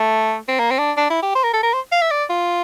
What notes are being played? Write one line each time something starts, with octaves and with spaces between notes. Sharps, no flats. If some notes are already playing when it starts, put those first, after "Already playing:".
Already playing: A3
C4
A#3
C4
D4
D4
E4
G4
C5
A#4
A4
A#4
C5
F5
E5
D5
F4